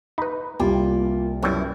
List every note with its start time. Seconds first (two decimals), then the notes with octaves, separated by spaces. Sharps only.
0.18 D#4 B4 B5
0.60 C2 A#3 F4 G4
1.43 F#2 B2 F#3 G3 E4